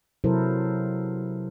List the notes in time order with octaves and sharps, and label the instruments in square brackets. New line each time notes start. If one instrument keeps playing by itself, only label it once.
[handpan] C3 F#3 E4 A4 A#4 C5